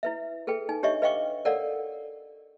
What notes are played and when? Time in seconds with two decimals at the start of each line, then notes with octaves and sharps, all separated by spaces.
0.03 E4 B4 E5
0.47 G#4 A4 B4 G5
0.69 D#4 G#5
0.83 D4 G4 C#5 D#5 E5 C#6
1.02 B4 D#5 F5 G5 C#6 D6
1.45 A4 A#4 C#5 D5 F5 F#5